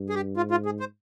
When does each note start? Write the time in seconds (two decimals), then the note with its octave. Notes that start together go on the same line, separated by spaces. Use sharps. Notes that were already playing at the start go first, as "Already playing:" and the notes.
Already playing: G2
0.10 G#4
0.15 G4
0.37 G#2 F4
0.51 F4
0.66 G#4
0.80 C5